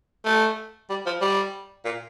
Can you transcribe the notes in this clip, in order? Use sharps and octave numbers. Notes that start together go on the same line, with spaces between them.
A3
G3
F3
G3
A#2